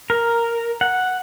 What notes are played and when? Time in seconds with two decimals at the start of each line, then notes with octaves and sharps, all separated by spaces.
0.10 A#4
0.81 F#5